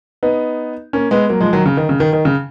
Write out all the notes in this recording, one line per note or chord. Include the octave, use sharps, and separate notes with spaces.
B3 D#4
A#3 C#4
G#3 B3
F#3 A#3
F3 G#3
D#3 F#3
C#3
D#3
C#3
D#3
D#3
C#3